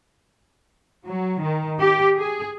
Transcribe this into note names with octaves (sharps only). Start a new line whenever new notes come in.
F#3
D#3
G4
G#4